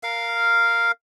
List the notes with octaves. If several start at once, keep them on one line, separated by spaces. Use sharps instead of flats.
A#4 F5